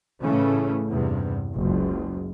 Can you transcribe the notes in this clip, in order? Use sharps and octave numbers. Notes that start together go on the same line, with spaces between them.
A2 C#3 E3 A3 C#4
E2 G2 C3
F#1 C#2